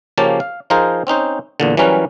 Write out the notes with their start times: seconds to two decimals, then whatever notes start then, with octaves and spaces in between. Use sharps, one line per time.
0.18 C#3 F3 A#3 C#4 G4 A5
0.40 F5
0.70 F3 D#4 F4 G#4 A#4 C5
1.07 C4 C#4 D#4 C5
1.60 E2 A#2 D3
1.77 E3 F#3 G3 C#4 A#4 B4